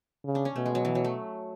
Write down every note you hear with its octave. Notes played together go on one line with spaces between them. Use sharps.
C#3
D4
C#4
B2 A3
G#3
F#3
E3
F#3
A3